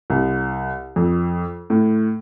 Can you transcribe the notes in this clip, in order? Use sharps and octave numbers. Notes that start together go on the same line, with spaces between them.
C2
F2
A2